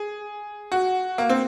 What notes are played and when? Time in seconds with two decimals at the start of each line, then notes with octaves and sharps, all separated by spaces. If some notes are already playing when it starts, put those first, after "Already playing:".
Already playing: G#4
0.72 F#4
1.18 A#3
1.30 C4